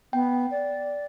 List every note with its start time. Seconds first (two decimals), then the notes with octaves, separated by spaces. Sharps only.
0.13 B3 G5
0.51 D5